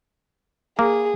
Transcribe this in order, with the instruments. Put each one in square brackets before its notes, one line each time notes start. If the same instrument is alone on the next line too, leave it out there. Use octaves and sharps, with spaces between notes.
[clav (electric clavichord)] A#3 [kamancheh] G#4